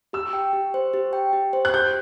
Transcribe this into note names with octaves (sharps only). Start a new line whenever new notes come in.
G4 E6
G5
G4
C5
G4
G5
G4
C5
F#6
G4 G6